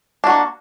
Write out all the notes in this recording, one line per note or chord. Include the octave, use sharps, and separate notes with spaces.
A#3 D4 F#4